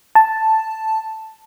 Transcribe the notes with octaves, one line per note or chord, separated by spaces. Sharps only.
A5